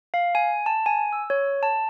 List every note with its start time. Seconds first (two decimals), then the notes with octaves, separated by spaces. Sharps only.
0.14 F5
0.35 G#5
0.66 A5
0.86 G#5
1.13 E6
1.30 C#5
1.63 A5